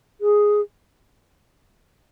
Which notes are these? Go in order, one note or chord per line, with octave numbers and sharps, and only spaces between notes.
G#4